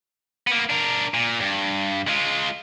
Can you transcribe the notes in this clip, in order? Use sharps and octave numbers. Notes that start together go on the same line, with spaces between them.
A#3 B3
D4 A#4
A#2
G2
G#3 F4